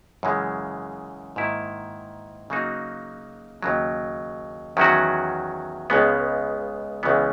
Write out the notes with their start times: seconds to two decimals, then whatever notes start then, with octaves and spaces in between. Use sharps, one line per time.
0.23 F#2 C#3 E3 G#3
1.36 G#2 D#3 A#3 E4
2.50 C#3 F#3 A#3 D#4 F#4
3.62 D#2 C#3 F#3
4.77 E2 D#3 F#3 C#4 F#4
5.90 C#2 C#3 G#3 B3
7.03 C#2 C#3 E3 B3